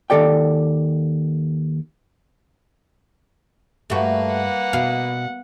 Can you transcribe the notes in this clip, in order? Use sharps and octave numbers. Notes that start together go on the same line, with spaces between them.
D#2 F#3 A4 D5 G5
G2 A3 A#3 F#4 B4
F#5
B2 F5